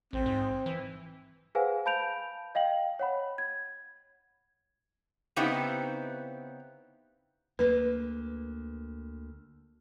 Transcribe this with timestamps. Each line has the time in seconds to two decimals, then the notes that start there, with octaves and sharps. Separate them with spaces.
0.13 A1 C4
0.26 G#2
0.66 E3
1.55 G#4 B4 C5 F5 F#5 G#5
1.85 F5 A5 B5 G6 D7 F7
2.55 D#5 F5 G5 F#7
2.99 C#5 F#5 B5
3.38 G#6
5.36 C#3 B3 C4 D#4 E4 G4
7.59 D2 A#3 B4